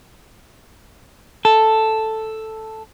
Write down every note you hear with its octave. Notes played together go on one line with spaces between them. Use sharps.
A4